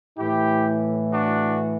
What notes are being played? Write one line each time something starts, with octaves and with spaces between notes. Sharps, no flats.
A2 E3 E4 G4
D4 F#4